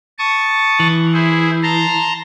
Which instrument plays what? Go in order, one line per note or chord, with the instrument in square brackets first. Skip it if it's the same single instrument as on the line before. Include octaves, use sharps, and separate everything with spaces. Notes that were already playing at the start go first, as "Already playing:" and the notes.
[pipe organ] A5 C#6 D#6
[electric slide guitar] E3
[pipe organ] E4 G#4 C5
A5 A#5 C6